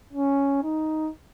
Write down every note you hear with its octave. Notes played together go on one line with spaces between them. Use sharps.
C#4
D#4